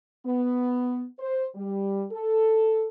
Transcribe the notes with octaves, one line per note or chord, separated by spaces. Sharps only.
B3
C5
G3
A4